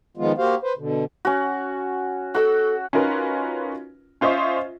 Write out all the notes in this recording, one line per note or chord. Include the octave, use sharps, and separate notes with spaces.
D#3 F3 G#3 B3 F4
A#3 F#4 G4 C5 F5
B4 C5
B2 D3
C#4 F#4
F#4 A4 E6
C#4 D#4 F4 F#4 A#4 B4
C#4 F4 C5 D#5 E5 C#6